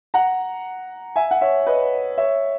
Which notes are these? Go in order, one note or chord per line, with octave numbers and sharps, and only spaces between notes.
F#5 A#5
E5 G#5
F#5
C#5 E5
B4 D#5
C#5 E5